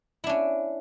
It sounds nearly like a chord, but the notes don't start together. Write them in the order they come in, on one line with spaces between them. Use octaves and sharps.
E4 D4 C#4